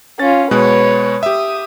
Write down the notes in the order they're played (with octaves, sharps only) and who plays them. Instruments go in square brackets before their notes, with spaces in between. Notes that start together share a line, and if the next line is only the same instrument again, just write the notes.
[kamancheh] C#4 F4 [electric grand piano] A6
[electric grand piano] B2 G#3 F#6 [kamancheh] B4 C#5
[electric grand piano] G4 E5 [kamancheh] D#6